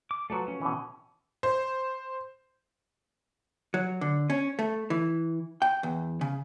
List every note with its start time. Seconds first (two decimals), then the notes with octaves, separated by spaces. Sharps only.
0.11 D6
0.30 F3 F#3 A3 F#4 B4
0.48 C#4
0.61 B2 E3
1.43 C5
3.74 F#3
4.01 D3
4.30 C#4
4.59 A3
4.90 E3
5.62 G5
5.83 E2
6.21 C#3